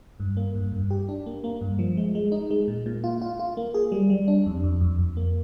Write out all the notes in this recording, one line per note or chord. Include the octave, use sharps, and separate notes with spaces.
G2
A#3
G2
G2
G4
D4
A#3
A#3
G2
F3
G#3
G#3
D#4
G#3
A#2
A#2
F4
F4
F4
A#3
G#4
G3
G3
D4
F2
F2
F2
F2
A#3